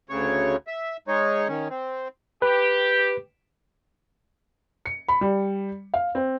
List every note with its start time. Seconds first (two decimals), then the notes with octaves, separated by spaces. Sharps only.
0.10 D2 C#3 C#5
0.67 E5
1.08 G#3 D#4 C#5
1.48 D#3 C#4
1.70 C4
2.42 G4 B4
4.86 C#7
5.08 B5
5.21 G3
5.94 F5
6.15 C4